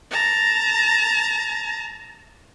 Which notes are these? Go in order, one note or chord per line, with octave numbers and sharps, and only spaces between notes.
A5 A#5